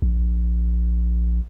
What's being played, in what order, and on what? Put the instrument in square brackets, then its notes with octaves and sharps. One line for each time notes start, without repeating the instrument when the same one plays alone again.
[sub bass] A#1